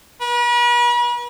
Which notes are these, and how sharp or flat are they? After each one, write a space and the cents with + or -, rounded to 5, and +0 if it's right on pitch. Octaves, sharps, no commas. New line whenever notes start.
B4 -40